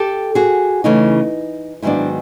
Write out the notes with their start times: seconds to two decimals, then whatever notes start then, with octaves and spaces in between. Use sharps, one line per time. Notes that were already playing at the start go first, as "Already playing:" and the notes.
Already playing: G4 A4
0.35 F#4 G#4
0.84 C#3 E3 A3 C#4 D#4
1.82 G#2 D#3 F#3 B3 D4 E4